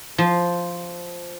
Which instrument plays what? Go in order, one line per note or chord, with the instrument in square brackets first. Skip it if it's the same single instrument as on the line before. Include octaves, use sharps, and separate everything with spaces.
[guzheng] F3